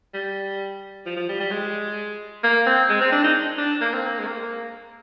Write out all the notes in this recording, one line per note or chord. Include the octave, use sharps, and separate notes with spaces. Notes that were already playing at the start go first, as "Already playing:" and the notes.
G3
F3
F3
G3
G3
G#3
A#3
C4
G#3
C4
D4
D#4
D4
A#3
C4
A#3
G#3
A#3